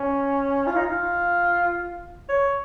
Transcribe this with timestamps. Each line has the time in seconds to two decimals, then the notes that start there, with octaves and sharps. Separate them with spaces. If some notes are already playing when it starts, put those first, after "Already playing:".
Already playing: C#4
0.67 F4
0.76 D#4
0.85 F4
2.29 C#5